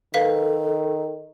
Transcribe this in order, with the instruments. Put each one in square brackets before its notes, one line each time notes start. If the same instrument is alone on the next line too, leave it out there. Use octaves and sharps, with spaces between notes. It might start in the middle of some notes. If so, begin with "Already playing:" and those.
[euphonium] D#3 [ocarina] A4 [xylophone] B4 F5 B6